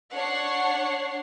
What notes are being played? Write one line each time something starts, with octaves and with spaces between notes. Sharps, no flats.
D4 C#5 F#5 C#6 C7